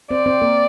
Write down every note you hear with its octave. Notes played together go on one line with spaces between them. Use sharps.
C4 C5 D5
C4 C5
A#3 A#4